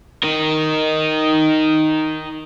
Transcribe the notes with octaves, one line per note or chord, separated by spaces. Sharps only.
D#4 A#4